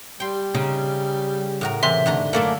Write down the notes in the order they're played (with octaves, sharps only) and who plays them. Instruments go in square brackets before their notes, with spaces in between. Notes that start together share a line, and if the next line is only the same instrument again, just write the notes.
[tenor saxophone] G3 [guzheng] G5 C6
[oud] C#3 [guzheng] D#4
[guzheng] A2 F#4 A#4
[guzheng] C3 E3 [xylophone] E5 C6
[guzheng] G#2 D3 A#5 [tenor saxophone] A3
[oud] F#2 A3 [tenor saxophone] A#3 [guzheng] A4 D5 F#5